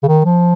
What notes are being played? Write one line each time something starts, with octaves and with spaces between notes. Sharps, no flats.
C#3
D#3
F3